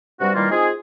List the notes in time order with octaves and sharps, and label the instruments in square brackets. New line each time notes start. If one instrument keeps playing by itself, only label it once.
[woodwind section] G2 C3 G3 F#4
D#3 E3 G3 A#3 F4
C4 D#4 F4 G#4